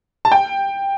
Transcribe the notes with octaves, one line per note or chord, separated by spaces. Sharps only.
A5
G5